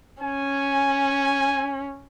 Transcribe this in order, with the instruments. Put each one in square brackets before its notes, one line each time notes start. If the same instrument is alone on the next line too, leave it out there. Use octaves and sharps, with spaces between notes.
[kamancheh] C#4 [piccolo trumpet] G#5